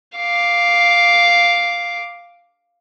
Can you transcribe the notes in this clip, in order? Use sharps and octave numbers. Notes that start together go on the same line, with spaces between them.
F5 D6